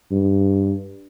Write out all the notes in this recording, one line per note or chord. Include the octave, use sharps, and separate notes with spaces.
G2